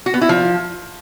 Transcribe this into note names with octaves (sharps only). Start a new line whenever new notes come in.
F#4
B3
E4
F3